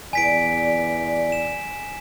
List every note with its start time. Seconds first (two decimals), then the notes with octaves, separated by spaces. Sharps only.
0.13 E2 D5 G#5 B6 D7
1.32 E7